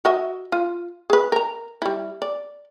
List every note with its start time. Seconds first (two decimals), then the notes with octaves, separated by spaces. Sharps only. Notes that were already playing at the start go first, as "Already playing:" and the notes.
0.05 F#4 D#5 E5
0.52 F4
1.10 G#4 B4
1.32 A#4 A#5
1.82 G3 E4
2.22 D5